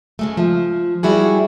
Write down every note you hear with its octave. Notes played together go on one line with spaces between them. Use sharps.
C#3 G#3 A3
F3
G3 E4 F#4 G#4